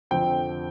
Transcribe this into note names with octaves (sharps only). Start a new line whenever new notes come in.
F1 F2 D3 F3 C4 G5